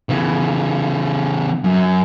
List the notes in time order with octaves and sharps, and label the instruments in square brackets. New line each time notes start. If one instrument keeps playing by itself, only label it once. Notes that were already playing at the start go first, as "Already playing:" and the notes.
[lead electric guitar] C#3 E3
F#2